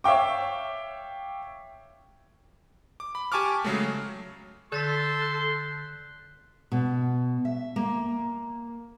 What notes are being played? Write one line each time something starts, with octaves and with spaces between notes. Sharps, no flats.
C#5 E5 F5 G5 D6
D6
B5
G4 G#5 A5 C#6 D6 F6
C#3 F#3 G#3 A3
D3 A4 C6 G6 A6 B6
F#6
B2
E5
A#3